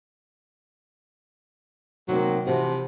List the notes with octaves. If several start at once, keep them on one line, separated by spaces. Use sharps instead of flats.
C3 D#3 F#3 A#3
C3 E3 F3 F#4